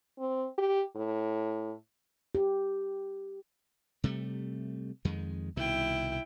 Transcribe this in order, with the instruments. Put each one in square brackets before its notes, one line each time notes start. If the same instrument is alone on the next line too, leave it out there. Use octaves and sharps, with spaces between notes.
[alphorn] C4
G4
A2
[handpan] G4
[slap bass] C3 G3 A3
F2 D#3 G#3
[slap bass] C2 B2 D#3 [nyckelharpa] E4 G5